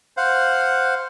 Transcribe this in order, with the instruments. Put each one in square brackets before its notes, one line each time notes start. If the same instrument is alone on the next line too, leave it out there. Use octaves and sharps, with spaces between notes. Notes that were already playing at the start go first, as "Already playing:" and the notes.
[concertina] C5 F5 F#5